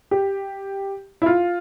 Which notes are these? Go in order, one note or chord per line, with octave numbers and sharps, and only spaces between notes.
G4
E4
F4